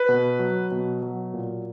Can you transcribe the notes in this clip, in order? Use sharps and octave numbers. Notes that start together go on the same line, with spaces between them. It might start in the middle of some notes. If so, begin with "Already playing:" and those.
Already playing: B4
B2
F#3
B2
F#3
A#2